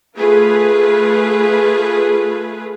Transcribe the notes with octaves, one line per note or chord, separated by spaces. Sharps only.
A3 F4 G#4 B4